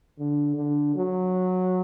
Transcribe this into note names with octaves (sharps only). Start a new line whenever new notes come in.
D3
D3
F#3